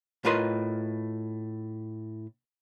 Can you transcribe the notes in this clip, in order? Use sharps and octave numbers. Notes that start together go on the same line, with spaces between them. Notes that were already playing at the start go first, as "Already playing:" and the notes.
A2 F4 A#4 B4 D#5 C6